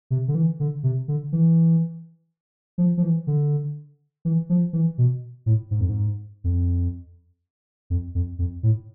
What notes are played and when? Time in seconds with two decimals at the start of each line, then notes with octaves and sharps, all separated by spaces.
0.10 C3
0.28 D3
0.35 E3
0.60 D3
0.83 C3
1.08 D3
1.32 E3
2.78 F3
2.97 F3
3.03 E3
3.27 D3
4.25 E3
4.49 F3
4.73 E3
4.98 B2
5.46 A2
5.71 G#2
5.80 F2
5.89 G#2
6.44 F2
7.90 F2
8.15 F2
8.39 F2
8.63 A2